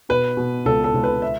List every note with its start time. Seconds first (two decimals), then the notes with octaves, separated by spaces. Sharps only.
0.09 B2 B4
0.37 B2
0.65 C#2 A4
0.84 A4
0.94 C#2
1.04 B4
1.22 E5